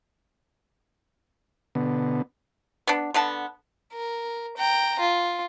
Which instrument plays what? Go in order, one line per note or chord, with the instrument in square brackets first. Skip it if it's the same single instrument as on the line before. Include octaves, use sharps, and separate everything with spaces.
[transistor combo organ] B2 D3 B3
[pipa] B3 D4
D3 B3 A5
[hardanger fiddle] A#4
G5 A#5
F4